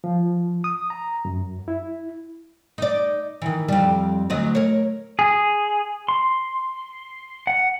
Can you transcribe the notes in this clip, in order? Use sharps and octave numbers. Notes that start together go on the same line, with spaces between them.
F3
D#6
A#5
F#2
E4
D#4 D5
D#3 E3
F2 G3
D2 F#3 D#5
A#4 C#5
G#4
C6
F#5